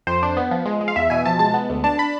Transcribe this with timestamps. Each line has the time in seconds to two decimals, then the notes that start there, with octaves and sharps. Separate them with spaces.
0.07 F2 C5
0.23 D4
0.37 B3
0.51 F3
0.66 G#3
0.81 G#3
0.88 F5
0.96 E2 E5
1.10 B2 G#5
1.26 F3 A5
1.39 G#3 A5
1.54 B3
1.70 D2
1.84 D4 A5
1.98 D4 B5